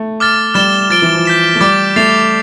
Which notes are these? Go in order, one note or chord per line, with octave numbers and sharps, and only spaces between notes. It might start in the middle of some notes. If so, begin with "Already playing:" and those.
Already playing: A3
D6 F6 A6
G3 F6 A6 E7 G7
F3 A6 D7 G7
E3
F3
G6 B6 E7
A3
G3 D6 A6 D7
A3 A6 C7 F7